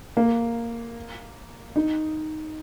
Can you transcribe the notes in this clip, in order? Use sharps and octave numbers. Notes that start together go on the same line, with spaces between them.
A#3
D#4